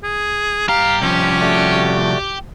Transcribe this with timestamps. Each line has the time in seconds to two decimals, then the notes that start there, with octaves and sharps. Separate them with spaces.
0.03 G#4
0.68 G2 G4 F5 A#5
1.02 C2 F3 C#4
1.40 A3 F#4 D5